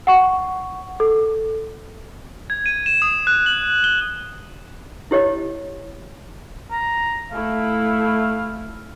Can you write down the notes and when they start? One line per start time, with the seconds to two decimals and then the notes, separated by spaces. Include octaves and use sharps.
0.07 F#5 C#6
1.00 A4
2.50 G#6
2.66 D#7
2.86 E7
3.02 D#6
3.27 F#6
3.46 F#7
3.84 G7
5.11 E4 G4 C#5 D#5
6.72 A#5
7.32 A3 E4 F5